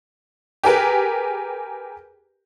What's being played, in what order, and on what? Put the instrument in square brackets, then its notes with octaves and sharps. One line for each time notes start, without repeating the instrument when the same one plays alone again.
[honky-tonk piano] G4 G#4 A#4 B4